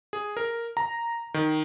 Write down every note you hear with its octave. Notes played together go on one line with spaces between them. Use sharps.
G#4
A#4
A#5
D#3